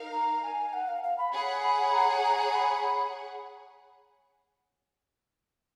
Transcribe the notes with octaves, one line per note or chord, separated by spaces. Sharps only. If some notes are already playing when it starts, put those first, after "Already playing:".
Already playing: D#4 A#4 F5
A#5
G#5
F#5
F5
F5
B5
G#4 C#5 F#5 B5
B5
A#5
A#5
B5
B5